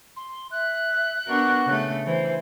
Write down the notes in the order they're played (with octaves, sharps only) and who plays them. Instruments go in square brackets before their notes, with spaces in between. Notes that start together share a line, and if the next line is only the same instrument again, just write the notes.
[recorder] C6
[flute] E5 [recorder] F#6
[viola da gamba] B3 D4 A#4 [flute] F#4
[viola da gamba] C#3 A3
[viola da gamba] E3 [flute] C5